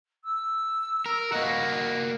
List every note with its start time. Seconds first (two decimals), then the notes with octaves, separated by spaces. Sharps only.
0.24 E6
1.06 A#4
1.32 A#3 F#4 D#5